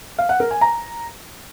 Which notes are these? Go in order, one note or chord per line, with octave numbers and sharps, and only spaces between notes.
F5
F#5
A#4
G#5
A#5